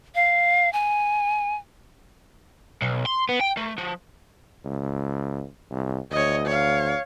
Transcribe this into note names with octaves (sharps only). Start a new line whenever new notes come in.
F5
G#5
B1
C6
B3
G5
A3
F3
C#2
C2
D2 C#5 D#5
C#5 F5